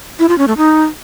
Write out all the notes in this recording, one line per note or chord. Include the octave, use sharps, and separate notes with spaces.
E4
F4
C#4
A3
D#4